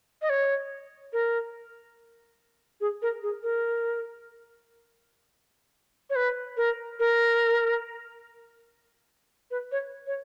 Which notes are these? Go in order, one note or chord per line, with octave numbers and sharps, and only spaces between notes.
D#5
C#5
A#4
G#4
A#4
G#4
A#4
C#5
B4
A#4
A#4
B4
C#5
C#5